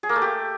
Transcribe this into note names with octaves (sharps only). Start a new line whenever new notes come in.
G#4
A#3
A3
G4